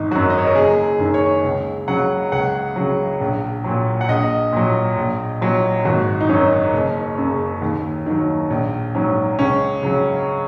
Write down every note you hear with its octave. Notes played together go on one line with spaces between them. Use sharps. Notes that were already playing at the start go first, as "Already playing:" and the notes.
Already playing: G#1 D#4
F#2 F#3 F#4
D#5
C#5
A#4
F#1 G#4
F#2 D#3
C#5
C#2
C#3 F#3 F#5
C#2 F#5
C#3 F#3
A#1
A#2 F#3
F#5
A#1 D#5
A#2 F#3
A#1
A#2 F#3
G#1 F#4
D#4
F#2 F#3 C#4
F#1
F#2 C#3
D#2
D#3 F#3
A#1
G#2 F#3 C#4
C#2 C#4
C#3 F#3